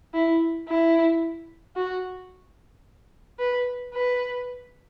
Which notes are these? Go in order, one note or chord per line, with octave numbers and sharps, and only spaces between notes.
E4
E4
F#4
B4
B4